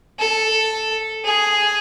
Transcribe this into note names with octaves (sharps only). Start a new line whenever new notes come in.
A4
G#4